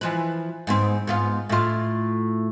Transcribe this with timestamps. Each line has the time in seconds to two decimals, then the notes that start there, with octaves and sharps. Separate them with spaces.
0.01 E3 F3 B4
0.67 G#2 B3 C4
1.07 G#2 B3 F4
1.49 A2 F4